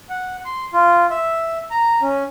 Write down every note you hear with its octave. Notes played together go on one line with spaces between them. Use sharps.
F#5
C6
F4
E5
A#5
C#4